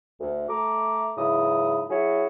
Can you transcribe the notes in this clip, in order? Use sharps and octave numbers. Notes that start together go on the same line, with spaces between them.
D2
A3 A#5 D6
G#2 C#3 E3 F#3 E4 D#6
F#3 C#4 E4 F#4 G#4 C#5